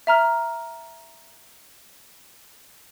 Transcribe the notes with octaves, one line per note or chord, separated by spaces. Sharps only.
E5 A#5 F6